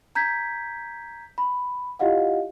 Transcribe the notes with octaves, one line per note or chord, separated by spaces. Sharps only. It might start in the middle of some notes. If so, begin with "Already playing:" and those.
A#5 G6 G#6 B6
B5
E4 F4 G4 D#5 F5 F#5